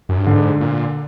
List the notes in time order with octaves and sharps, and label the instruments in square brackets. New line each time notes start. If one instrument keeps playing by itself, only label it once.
[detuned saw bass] F#2
G2
[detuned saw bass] G#2 [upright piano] D3
[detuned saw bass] A#2